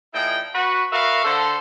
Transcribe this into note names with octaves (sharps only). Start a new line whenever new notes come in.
A#2 F3 D#4 E4 G#4 G5
F#4 B4
F#4 A#4 B4 E5 F5
D3 A4 C5